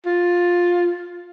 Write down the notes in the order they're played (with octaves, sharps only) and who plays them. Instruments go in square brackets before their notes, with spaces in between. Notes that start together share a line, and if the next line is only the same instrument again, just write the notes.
[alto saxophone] F4